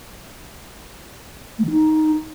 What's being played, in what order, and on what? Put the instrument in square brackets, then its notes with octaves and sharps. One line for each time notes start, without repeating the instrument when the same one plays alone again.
[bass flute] A3
D#3
D#4